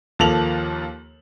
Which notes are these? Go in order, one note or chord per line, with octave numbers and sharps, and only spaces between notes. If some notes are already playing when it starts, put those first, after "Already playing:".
D#2 F3 A#3 A4 F7 F#7